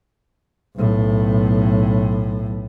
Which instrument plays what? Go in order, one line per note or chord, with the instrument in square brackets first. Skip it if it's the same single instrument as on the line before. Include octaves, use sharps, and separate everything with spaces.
[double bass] B1 A2